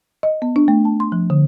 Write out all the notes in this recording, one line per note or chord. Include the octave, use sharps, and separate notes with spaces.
D#5
B3
D4
A3
A5
C6
F3
D3